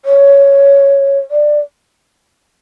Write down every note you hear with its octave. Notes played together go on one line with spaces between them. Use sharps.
C#5
D5